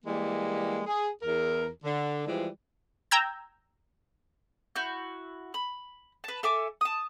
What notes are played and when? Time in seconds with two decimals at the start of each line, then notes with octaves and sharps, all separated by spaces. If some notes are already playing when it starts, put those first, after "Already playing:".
0.05 E3 G3 G#3 A#3
0.87 G#4
1.22 E2 A#4
1.85 D3
2.27 E3 F3 G3 G#3 D5
3.11 G5 A#5 E6 G6 G#6
4.76 E4 F#4 G6
5.54 B5
6.24 B4 A5
6.43 A4 E5 G#5 D6
6.81 A5 D#6